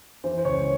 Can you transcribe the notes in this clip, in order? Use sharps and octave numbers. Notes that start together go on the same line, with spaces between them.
E3 C5
C5
C#2 C#5